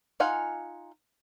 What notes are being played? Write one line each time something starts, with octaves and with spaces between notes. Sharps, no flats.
D#4 F4 F5 F#5 G#5